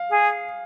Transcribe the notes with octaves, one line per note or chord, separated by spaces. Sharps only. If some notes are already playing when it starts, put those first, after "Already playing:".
Already playing: F5
G#4